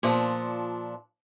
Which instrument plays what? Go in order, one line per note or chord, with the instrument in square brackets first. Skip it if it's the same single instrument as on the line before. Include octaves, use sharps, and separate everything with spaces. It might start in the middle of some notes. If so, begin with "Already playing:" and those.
[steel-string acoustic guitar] A#2 F3 D4